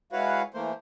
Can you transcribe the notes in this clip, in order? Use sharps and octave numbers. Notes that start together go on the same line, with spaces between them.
G#3 E4 F#4 B4 C#5 F5
E3 A3 A#3 C5